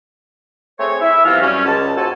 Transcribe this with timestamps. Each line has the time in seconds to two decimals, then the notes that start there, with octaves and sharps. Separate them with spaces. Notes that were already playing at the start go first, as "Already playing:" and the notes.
0.79 A3 C4 G#4 C#5
1.01 E4 E5
1.25 C2 E3 F3 B3 C4 F6
1.41 F#2 G3 C#4
1.66 C#2 A5
1.96 D#2 G#2 F#4 A4 G#5 A5